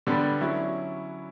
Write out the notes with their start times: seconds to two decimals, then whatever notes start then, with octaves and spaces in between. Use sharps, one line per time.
0.07 D3 G3 B3 D4
0.41 F#3 C#4 E4